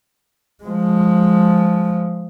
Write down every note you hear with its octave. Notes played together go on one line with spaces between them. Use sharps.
F3 G#3